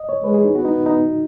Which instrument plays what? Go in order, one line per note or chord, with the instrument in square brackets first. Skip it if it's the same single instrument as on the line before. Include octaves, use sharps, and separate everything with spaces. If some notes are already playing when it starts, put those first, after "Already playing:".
Already playing: [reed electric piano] D#5
C#5
[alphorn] G#3 [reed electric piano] B4
[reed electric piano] G#4
D#4
[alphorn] B3 [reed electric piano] F#4
[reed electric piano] D#4
D#4